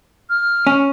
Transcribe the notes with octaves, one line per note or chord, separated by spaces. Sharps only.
F6
C#4